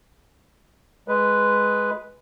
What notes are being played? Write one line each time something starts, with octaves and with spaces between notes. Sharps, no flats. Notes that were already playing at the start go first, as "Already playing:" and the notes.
G#3 B4